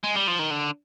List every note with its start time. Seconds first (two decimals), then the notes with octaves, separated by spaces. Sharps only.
0.04 G#3
0.15 G3
0.27 F3
0.39 D#3
0.51 D3